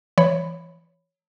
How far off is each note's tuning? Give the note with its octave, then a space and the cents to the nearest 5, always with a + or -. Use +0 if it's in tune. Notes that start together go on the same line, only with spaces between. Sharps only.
E3 +30 C#5 +0 B5 +10